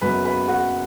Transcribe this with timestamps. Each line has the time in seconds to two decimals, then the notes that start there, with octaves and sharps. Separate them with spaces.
0.01 F#1 F#2 F#3 B3 B4 B5
0.25 B4 B5
0.48 F#4 F#5